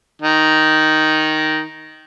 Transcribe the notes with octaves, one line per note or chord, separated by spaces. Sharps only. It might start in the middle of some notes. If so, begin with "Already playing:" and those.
D#3 D#4